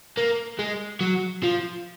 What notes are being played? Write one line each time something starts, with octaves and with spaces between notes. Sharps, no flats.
A#3
G#3
F#3
F3